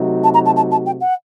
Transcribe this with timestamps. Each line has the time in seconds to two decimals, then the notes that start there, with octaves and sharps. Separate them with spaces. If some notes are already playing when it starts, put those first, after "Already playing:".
Already playing: C3 F#3 A3 D#4 F#4
0.24 A5
0.34 A#5
0.46 A5
0.56 A5
0.71 A5
0.86 G5
1.01 F#5